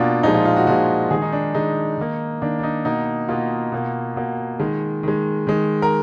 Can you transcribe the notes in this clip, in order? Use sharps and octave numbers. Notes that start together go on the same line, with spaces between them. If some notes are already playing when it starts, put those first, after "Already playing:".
Already playing: B2 A#3 D4 F4
A#2 F3 G#3 D#4
F4
F4
F#4
A#2 F3 G#3 F#4
D#3 G#3 G#4
D#4
D4
D#3 G#3 D#4
D#3 A#3
D#3 A#3 D4
D4
D#4
B2 A#3 D#4
B2 A#3 F4
B2 A#3
B2 A#3
D#3 G#3
D#3 G#3
D#3 G#3
A#4